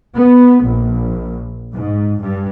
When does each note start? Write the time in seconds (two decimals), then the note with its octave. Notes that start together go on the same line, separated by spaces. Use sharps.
0.16 B3
0.65 A#1
1.74 G#2
2.21 G2